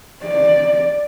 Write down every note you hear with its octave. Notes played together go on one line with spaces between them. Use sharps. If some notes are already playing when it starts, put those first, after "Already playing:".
D5